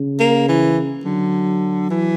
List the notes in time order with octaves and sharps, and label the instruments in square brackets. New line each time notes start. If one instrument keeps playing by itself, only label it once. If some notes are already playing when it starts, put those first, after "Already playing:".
Already playing: [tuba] C#3
[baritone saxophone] A#3
E3
[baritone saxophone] D3 [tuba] F#3
[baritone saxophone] E3